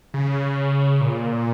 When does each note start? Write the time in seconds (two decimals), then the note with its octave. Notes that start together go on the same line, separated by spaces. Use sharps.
0.14 C#3
1.01 A#2